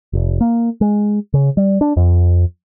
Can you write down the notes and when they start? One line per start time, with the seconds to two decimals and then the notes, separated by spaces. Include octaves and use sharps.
0.13 F1
0.41 A#3
0.81 G#3
1.34 C#3
1.57 G3
1.81 D4
1.97 F2